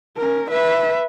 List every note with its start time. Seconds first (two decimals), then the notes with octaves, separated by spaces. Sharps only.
0.17 C#4 A#4
0.50 B4 E5